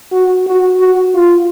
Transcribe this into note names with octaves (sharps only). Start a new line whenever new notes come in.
F#4
F#4
F#4
F4